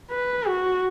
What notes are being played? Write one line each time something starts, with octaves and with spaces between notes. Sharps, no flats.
B4
F#4